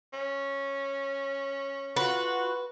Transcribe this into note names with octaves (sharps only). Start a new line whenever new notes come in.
C#4
F4 F#4 B4